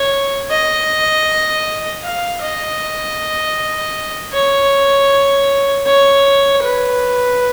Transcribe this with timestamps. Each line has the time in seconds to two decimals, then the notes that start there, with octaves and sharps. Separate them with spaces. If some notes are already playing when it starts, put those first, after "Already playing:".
Already playing: C#5
0.50 D#5
2.03 F5
2.42 D#5
4.33 C#5
5.86 C#5
6.63 B4